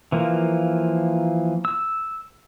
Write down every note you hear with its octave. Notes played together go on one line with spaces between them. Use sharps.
E3 F3 A#3
E6